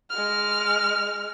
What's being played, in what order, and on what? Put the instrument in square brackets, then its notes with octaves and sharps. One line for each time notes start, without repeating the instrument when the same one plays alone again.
[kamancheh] G#3 F6